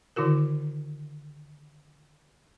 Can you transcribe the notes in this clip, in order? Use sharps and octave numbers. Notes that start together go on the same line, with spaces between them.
D3 D#3 E4 F#4 A#4